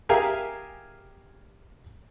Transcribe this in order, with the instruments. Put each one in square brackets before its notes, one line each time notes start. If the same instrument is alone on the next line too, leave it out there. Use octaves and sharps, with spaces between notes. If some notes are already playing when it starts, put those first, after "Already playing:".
[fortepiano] G4 G#4 A#4 E5 F5 G#5